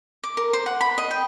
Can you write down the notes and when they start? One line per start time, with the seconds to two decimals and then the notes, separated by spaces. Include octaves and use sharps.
0.24 D6
0.37 A#4
0.53 C5
0.66 F#5
0.81 B5
0.98 D#5
1.11 G5